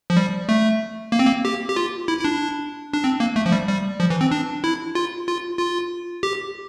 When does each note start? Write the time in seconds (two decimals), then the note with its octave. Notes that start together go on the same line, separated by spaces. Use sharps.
0.10 F3
0.17 G3
0.49 A3
1.12 A#3
1.19 C4
1.26 A#3
1.45 G4
1.68 G4
1.76 F4
2.08 E4
2.19 E4
2.25 D4
2.93 D4
3.04 C4
3.20 A#3
3.36 A3
3.46 F3
3.52 G3
3.68 G3
4.00 F3
4.10 E3
4.21 C4
4.31 D4
4.64 E4
4.95 F4
5.27 F4
5.59 F4
6.23 G4